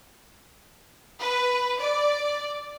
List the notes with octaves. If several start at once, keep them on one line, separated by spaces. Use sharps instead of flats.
B4
D5